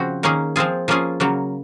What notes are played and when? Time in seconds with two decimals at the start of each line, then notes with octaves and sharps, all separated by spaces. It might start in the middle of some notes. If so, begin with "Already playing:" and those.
Already playing: C#3 F3 C4 F#4
0.23 D#3 A#3 C#4 G#4
0.56 F3 C4 F4 G#4
0.88 F3 A#3 C#4 F4 G#4
1.20 C#3 F#3 A#3